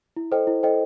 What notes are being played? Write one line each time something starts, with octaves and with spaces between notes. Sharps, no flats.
E4
A4 C5 D#5 G5
E4
A4 C5 D#5 G5